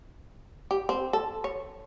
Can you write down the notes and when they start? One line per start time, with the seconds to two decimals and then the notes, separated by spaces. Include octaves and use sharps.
0.71 G4
0.89 C4
1.13 A4
1.44 C#5